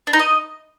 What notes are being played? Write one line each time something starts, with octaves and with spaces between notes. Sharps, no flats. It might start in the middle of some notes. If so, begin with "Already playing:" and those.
D4
D#4
D#5